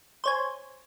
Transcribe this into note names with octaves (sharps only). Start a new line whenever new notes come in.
C5 C#5 G#5